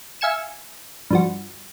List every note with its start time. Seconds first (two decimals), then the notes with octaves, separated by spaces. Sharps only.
0.21 E5 F5 G#5 G#6 C#7 E7
1.10 G2 F3 F#4